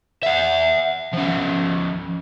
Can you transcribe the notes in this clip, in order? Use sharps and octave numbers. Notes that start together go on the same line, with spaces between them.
E5 F#5
F3 C#4